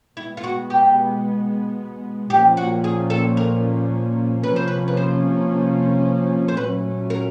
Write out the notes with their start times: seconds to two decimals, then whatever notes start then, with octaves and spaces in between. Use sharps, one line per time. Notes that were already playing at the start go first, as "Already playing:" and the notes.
0.17 B2 G#3 B3 E4
0.37 F4
0.43 F#4
0.70 G4
2.30 A#2 F3 A#3 C#4 G4
2.57 F#4
2.84 G#4
3.10 A4
3.37 A#4
4.43 C3 F3 A#3 C#4 B4
4.56 C5
4.68 B4
4.88 B4
4.97 C5
6.48 C5
6.57 A#2 F#3 A3 C#4 B4
7.10 A#4